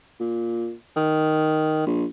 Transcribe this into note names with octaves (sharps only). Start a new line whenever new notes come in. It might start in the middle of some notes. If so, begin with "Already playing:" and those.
A#2
D#3
A#1